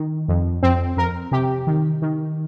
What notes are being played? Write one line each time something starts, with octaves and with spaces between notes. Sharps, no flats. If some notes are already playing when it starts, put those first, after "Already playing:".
Already playing: D#3
F2
F2 C4
F2 A#4
C3 G4
D#3
D#3